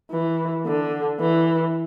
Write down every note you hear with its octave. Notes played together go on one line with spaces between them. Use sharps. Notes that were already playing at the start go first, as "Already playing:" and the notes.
E3
D3
E3